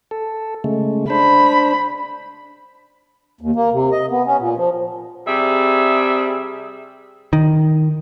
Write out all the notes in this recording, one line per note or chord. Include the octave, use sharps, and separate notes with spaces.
A4
C#3 G#3 A3
D4 C5 B5
D#2
A#3
C3
D#5
B3
C#4
A#2
F3
C3 G3 G#4 E5
D#3